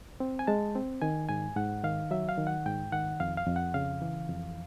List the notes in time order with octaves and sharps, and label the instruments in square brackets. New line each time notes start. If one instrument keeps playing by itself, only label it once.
[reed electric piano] C4
G#5
G#3 A5
C4
D#3 G#5
G#2 G#5
G#2 F#5
D#3 F5
F#3 E5
F5
D#3
F#5
G#2 G5
D#3 F#5
F2 F5
F5
F2
F#5
C#3 F5
E3
F2